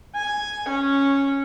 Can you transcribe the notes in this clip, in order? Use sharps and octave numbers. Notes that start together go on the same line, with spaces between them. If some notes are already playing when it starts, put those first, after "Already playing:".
G#5
C#4